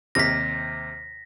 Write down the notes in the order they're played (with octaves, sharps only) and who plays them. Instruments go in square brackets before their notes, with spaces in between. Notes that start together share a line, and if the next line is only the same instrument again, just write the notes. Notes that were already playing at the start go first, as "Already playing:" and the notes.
[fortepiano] D#2 C3 F6 [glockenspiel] A#6 B6